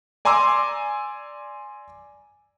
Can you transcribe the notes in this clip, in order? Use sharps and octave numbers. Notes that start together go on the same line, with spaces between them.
D5 G#5 A#5 C6 D6 E6